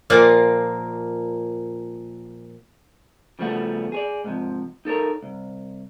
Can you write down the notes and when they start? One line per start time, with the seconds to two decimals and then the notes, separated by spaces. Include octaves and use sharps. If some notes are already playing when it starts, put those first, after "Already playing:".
0.10 A#2 F3 A#3 C5 F#5
3.39 C#3 F3 G3 A3 B3 F#4
3.92 G#4 C#5 D5
4.24 G#2 C3 F3
4.85 D#4 A4 A#4 C#5
5.22 C2